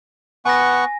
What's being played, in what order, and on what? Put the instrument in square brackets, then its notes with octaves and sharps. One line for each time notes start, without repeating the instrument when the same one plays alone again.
[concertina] B3 F#5 C#6 [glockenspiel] G#5 A#6